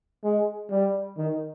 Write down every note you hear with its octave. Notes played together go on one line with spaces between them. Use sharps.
G#3
G3
D#3